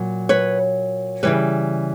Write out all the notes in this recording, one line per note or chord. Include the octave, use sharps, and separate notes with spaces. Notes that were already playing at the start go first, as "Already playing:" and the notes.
Already playing: A#2 F#3
B4 C#5
C#3 E3 G3 B4 C#5